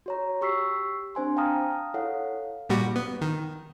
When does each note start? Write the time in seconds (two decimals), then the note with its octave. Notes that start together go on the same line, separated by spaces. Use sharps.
0.06 F#4 C#5 A#5
0.41 G4 C#6 E6 B6 C7
1.15 C4 D4 C5 G#5 C6
1.36 F5 G5 A5 A#5 D#6 F6
1.94 E4 A4 C#5 F5 F#5
2.69 A#2 G3 F#4
2.96 B3
3.21 D#3